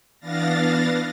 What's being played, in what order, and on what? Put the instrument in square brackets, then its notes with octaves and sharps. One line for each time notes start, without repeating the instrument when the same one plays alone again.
[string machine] E3 B3 D4 F5 A6 A#6